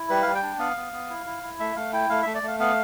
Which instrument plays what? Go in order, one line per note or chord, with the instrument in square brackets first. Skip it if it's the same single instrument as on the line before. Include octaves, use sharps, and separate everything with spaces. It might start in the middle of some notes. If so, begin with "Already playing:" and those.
Already playing: [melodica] E4
G3 B4
G3 F5
G5
D4
B3 F5
B3
B3
E4
E4
E4
A3 E5
A3 F5
E4 G5
A3 F5
A3 E5
D5
A3 F5
B3 F5